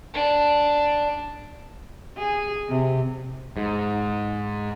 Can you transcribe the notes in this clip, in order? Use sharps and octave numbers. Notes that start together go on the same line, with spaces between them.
D4
G#4
C3
G#2